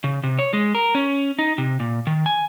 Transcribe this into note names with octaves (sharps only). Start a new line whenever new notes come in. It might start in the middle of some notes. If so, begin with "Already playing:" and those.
C#3
C3
C#5
G#3
A#4
C#4
D#4
C3
A#2
D#3
G#5